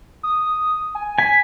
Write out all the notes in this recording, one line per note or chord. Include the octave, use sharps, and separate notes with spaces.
D#6
G#5
G#5 B6